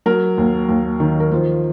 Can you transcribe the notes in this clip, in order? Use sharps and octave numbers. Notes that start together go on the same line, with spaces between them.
F#3 A#4
D#2
D#2
D#3
A#4
F3 C5